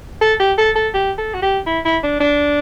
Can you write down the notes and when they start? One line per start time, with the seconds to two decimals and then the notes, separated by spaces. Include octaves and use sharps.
0.21 A4
0.40 G4
0.58 A4
0.76 A4
0.94 G4
1.18 A4
1.34 F#4
1.42 G4
1.67 E4
1.85 E4
2.03 D4
2.20 D4